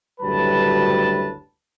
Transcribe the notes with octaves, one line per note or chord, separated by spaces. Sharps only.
F#1 D2 A2 G3 B4 A5